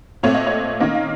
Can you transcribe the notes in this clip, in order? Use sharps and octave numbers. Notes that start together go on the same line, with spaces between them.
A#2 A3 C4 C#5
D#5
C#5
D#3 A#3 C#4 D#5
F5